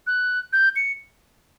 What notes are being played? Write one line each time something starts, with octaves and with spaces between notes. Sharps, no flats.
F#6
G6
C#7